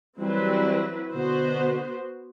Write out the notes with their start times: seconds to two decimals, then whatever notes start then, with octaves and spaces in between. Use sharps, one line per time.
0.19 E3 F#3 G3 C4 E4 B4
1.13 B2 D3 B3 F#4 C5